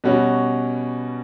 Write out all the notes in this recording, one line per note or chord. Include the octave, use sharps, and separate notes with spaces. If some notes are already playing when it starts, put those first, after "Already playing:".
B2 G3 C#4 F#4